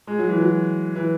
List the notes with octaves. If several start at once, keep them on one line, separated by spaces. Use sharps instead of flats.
G#3
F#3
E3
F#3
E3